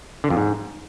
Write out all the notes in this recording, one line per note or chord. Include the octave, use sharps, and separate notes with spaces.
D3
F2
G#2